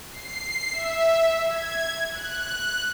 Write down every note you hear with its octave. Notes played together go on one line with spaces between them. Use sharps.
C7
E5
G#6
F#6